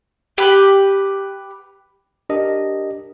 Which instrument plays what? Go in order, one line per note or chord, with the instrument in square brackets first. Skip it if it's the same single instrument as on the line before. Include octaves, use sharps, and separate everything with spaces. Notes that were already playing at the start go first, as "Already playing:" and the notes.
[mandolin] G4 B4
[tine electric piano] D4 G4 A#4 D#5